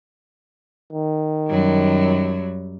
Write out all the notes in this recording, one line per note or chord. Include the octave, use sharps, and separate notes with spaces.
D#3
F#2 F#3 G3